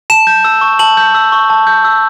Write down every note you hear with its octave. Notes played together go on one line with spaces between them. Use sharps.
A5 E7
G6
E6
C#6
A5 F#7
G6
E6
C#6
A5
G6
E6